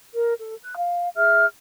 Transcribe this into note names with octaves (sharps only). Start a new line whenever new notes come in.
A#4
A4
F#6
F5
G#4 E5 F6